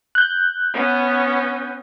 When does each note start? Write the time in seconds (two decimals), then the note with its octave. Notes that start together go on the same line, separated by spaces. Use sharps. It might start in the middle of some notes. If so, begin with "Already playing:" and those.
0.15 F#6 G6
0.73 B3 C#4